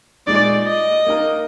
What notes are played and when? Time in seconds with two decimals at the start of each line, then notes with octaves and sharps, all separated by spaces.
0.27 A#2 G#3 D#4 D5
0.67 D#5
1.06 A#3 D#4 A#4